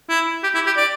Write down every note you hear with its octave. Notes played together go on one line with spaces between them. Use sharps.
E4
G4
E4
G4
D5